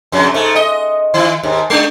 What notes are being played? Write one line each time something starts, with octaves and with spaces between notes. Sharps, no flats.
F2 C#3 F#3
G#2 A3
D#5
D#3 E4
D#2 G#2
G#3 D4